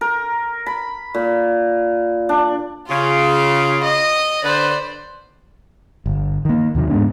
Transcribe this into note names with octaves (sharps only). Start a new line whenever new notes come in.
A#4
B5
A#2
D4
C#3 F4
D#5
D3 B4 C5 D5
G1
D#3 A#3
D#2 C3 D#3 F#3
G#2 G#3 B3 D4